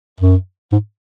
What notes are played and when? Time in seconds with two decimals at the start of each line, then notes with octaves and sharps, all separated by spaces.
0.20 F#2
0.72 G#2